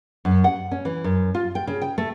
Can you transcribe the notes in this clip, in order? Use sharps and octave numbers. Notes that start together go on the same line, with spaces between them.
F#2
F#5
C#4
E3
F#2
F4
G5
C#3
G5
A3